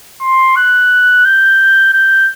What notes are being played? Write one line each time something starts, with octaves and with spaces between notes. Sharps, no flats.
C6
F#6
G6
G6